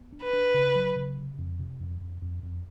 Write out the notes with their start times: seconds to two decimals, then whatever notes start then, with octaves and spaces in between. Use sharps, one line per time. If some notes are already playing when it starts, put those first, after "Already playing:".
Already playing: B3
0.12 D4
0.23 B4
0.33 D4
0.54 C#3
0.75 F#3
0.96 C#3
1.17 C3
1.38 F2
1.59 C3
1.80 F2
2.01 F2
2.22 F2
2.43 F2